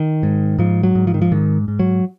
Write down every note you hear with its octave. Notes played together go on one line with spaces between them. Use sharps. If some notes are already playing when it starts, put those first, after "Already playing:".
Already playing: D#3
G#2
G#2 F3
F#3
G#2
F3
D#3
F3
G#2 D#3
G#2
F#3